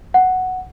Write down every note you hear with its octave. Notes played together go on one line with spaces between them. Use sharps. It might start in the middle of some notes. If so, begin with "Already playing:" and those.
F#5